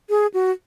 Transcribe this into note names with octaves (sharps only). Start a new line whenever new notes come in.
G#4
F#4